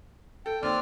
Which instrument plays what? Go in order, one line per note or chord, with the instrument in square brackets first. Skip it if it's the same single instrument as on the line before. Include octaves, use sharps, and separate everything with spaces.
[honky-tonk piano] A4 [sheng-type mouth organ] G5
[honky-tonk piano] D#2 [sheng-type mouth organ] C4 D5 F6